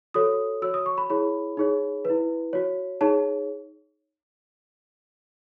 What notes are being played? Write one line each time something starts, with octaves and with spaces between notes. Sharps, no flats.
F#4 A4 C#5 D#6
F#4 C#5 E6
D#6
C#6
B5
E4 G#4 C#5 B5
D#4 G#4 C#5
E4 B4
F#4 C#5
D#4 G#4 C#5 A5